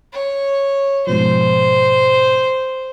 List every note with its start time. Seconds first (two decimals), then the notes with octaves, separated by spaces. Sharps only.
0.13 C#5
1.07 G#2 B2 F3 C5